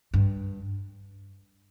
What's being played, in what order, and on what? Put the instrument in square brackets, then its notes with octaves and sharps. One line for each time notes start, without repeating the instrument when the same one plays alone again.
[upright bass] G2